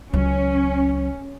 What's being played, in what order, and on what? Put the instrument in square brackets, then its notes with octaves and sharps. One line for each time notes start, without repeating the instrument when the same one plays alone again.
[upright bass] C#2 F#3 [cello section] C#4